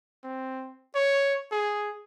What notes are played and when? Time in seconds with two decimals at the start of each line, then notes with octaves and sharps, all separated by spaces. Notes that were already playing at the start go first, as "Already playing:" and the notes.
0.24 C4
0.95 C#5
1.52 G#4